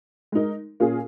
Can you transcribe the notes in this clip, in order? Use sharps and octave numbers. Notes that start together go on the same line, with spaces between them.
G#3 D#4 A#4
A#2 A#3 C#4 F4 G#4